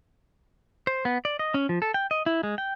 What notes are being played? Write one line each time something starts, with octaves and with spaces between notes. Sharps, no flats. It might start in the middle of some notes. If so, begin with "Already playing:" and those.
C5
B3
D5
D#5
C#4
F3
A4
G5
D#5
E4
G#3
G5